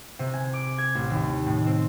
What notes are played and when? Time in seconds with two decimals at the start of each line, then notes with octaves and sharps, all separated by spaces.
0.19 C3
0.34 G#5
0.53 D6
0.78 G#6
0.95 A1
1.10 D#2
1.46 A2
1.66 C4